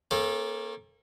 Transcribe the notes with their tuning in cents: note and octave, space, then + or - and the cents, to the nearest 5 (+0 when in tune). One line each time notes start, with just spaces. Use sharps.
A#3 +5 C#4 -40 A4 -20